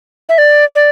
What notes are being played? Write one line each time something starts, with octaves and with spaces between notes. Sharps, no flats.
E5
D5
D5